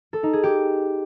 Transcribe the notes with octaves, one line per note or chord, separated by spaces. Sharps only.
A4
D#4
G#4
G4